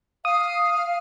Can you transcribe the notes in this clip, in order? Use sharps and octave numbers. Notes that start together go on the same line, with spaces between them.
F5 D#6